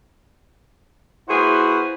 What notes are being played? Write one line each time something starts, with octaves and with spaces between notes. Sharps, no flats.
A#3 E4 F#4 G#4 B4 C5